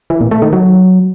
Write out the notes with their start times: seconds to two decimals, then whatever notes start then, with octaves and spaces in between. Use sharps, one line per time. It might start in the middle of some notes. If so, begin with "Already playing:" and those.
0.10 E3
0.21 A#2
0.31 A3
0.42 D#3
0.53 F#3